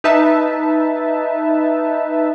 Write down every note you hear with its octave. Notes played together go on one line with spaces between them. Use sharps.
D#4 B4 E5 A5